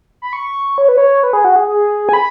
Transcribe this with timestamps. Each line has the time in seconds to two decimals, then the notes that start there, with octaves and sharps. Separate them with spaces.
0.22 B5
0.33 C#6
0.78 C#5
0.89 B4
0.98 C#5
1.23 B4
1.33 G#4
1.45 F#4
1.56 G#4
1.68 G#4
2.09 G#5
2.13 B5